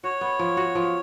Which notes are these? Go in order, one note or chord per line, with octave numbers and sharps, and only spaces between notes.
F#4 C#5
B3
F3
F#4
F3